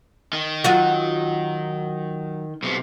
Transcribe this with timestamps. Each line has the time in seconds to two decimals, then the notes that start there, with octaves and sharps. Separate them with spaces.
0.33 D#3
0.64 F#3 F4 F#4
2.63 B1 C3